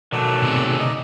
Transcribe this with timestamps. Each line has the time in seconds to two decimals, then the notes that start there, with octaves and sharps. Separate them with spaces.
0.12 B2 D#3 F#3 A3 A4 D5
0.43 C3 G#4
0.80 D#4 D5 D#5